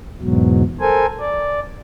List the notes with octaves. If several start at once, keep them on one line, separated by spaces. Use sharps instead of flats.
E2 G#2 B2 F#3
A4 A#4 C5 G#5
D5